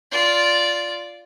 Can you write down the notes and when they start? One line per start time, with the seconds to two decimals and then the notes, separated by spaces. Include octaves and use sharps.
0.12 F4 D5